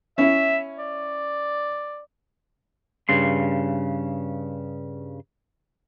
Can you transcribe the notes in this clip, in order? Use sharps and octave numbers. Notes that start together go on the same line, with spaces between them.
C#4 E4 E5
D5
G2 C#3 C6